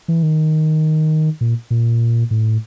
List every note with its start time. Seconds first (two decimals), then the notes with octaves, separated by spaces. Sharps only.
0.08 E3
0.23 D#3
1.41 A#2
1.70 A#2
2.31 A2